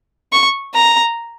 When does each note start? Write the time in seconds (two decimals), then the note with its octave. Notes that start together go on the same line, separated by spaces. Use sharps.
0.33 C#6
0.74 A#5